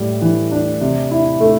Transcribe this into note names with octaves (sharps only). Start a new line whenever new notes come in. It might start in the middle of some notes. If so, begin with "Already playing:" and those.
Already playing: A2 G3
E3
D4
C3
E4
A3